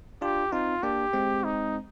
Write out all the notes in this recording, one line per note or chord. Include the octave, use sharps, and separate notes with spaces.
D4 F4 G4
C4 D#4 F4
A#3 D4 G4
G#3 C4
D#4